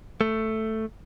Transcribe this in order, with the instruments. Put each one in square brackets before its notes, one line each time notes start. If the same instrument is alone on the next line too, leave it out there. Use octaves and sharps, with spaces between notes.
[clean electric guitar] A3